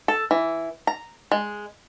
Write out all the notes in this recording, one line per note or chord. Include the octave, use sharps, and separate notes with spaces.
A4
E3
A#5
G#3